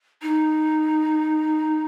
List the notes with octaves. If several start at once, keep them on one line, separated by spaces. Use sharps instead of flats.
D#4